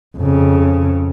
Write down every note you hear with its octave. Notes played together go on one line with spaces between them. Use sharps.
F2 C#3